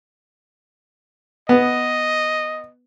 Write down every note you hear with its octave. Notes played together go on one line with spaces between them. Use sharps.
B3 D#5